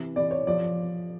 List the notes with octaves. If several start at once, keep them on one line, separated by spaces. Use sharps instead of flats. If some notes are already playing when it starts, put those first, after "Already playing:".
Already playing: C3 E3
C3 E3 D5
C#5
F3 D5